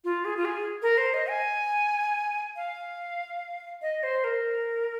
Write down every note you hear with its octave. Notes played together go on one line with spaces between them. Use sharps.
F4
G#4
F4
G#4
A#4
C5
D#5
G#5
F5
D#5
C5
A#4